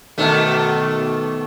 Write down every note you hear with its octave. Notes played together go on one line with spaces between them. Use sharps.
B2 D#3 A3